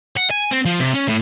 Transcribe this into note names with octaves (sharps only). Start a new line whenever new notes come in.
F#5
G#5
C4
F3
C3
C#4
A2